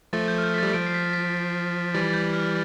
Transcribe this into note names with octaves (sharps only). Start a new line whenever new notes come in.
F3 A3 A6
G6
F6
G6
B6
G3 A6
F3 D7
C7
B6
B6
E3 G3 A6
A6
G6
F6